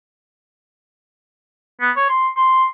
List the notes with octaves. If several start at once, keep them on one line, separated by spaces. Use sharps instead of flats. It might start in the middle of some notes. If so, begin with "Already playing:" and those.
B3
C#5
C6
C6